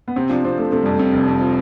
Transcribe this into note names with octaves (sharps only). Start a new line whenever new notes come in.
B3
C3 C4
F3 D4
F3 C4
C3 A3
C3 A3
F2 G3
A3
C3
F1
F2
F3